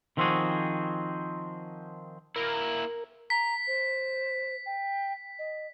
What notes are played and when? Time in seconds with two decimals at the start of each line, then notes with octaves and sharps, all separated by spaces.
0.17 D#3 F3 C4 C#4 F#4 G#4
2.36 A#3 E4 A#4
3.30 A#5 B6
3.67 C5
4.66 G5
5.39 D#5